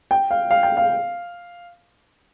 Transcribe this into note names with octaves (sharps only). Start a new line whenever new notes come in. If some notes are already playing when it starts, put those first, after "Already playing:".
G5
F5
F5
G5
F5